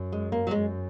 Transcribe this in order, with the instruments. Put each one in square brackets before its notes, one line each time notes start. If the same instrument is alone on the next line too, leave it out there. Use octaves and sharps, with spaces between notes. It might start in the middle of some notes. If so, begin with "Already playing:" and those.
Already playing: [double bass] F#2
[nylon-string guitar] G#3
A#3
F#3
[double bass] F#2 [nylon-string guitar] G#3